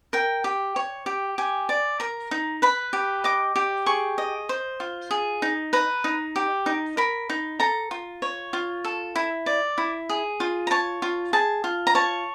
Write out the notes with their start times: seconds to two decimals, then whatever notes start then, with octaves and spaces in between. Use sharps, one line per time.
0.13 A#4 G5
0.44 G4
0.76 C#5
1.06 G4
1.38 G4 G#5
1.69 D5
2.00 A#4 A#5
2.31 D#4
2.62 B4 B5
2.93 G4
3.24 D#5 D6
3.56 G4
3.86 G#4 C#6
4.18 D#5
4.49 C5
4.80 F4
5.11 G#4
5.42 D#4
5.73 B4 A#5
6.04 D#4
6.36 G4
6.66 D#4
6.97 A#4 B5
7.29 D#4
7.60 A4 A#5
7.91 F4
8.22 C#5
8.53 F4
8.84 A4
9.16 E4
9.46 D5
9.78 E4
10.09 G#4
10.40 F4
10.67 A#5
10.71 C#5 A5
11.02 F4
11.33 G#4 A5
11.64 F4
11.87 A#5
11.95 C#5 A5